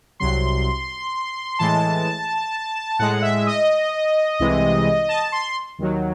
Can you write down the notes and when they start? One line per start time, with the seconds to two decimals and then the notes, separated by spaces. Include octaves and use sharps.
0.20 C2 C3 F#3 C6
1.59 A2 E3 G#3 A5
2.99 A2 G#3 F#5
3.22 E5
3.47 D#5
4.39 C2 C3 E3 G#3
5.09 A5
5.32 C6
5.79 D#2 D#3 F#3